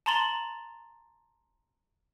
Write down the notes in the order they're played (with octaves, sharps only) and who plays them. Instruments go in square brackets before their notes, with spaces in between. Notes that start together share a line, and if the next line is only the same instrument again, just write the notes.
[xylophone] A5 A#5 C6 A6 F#7 G7